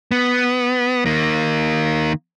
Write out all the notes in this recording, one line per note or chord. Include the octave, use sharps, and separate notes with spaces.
B3
D#3 A#3